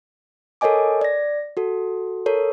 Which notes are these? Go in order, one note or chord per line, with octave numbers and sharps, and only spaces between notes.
A4 A#4 C#5 D#5 G#5 D6
D5 A#6
F#4 A4
A4 A#4 C#5